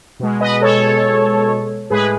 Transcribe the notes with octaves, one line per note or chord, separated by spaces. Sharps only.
B2 G#3
B4 D#5
A4 C#5
A2 G#3 G#4 B4